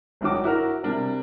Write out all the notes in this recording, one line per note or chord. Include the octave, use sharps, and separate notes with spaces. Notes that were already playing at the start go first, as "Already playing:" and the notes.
G#1 G2 D#3 F#3 F#4 D6
E4 F#4 A#4
C3 G3 D4 A#4